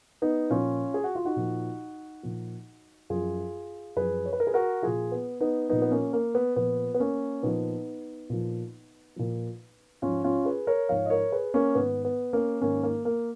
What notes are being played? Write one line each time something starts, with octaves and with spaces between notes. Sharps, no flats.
B3 D#4
A#2 F3 C#4 F4
G#4
F#4
F4
D#4 F#4
A#2 F3
A#2 F3
F#2 F3 F4 G#4
F#2 F3 G#4 B4
C#5
B4
A#4
G#4 B4
F#4 A#4
A#2 F3 F4 G#4
B3
B3 D#4
A#2 F3 B3 D#4
B3
A#3 C#4
A#3
B3
A#2 F3 B3
B3
A#3 C#4
A#2 F3 B3 D#4
A#2 F3
A#2 F3
G#2 F3 C#4 F4
C#4 F4
G#4 B4
A#4 C#5
G#2 F3 C#5 F5
D#5
A#4 C#5
G#4 B4
A#3 C#4
G#2 D#3 B3
B3
A#3 C#4
G#2 D#3 A#3 C#4
A#3
A#3